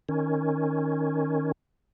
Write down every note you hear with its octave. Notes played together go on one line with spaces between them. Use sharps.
D#3 C#4